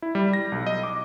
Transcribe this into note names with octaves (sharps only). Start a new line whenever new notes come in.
E4
G3
A#6
B1
D#5
D6